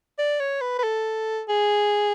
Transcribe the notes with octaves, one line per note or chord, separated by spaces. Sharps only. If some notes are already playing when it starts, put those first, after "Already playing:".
D5
C#5
B4
B4
A4
G#4